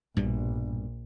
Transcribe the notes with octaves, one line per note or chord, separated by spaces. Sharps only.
A#1 G2 B2 G3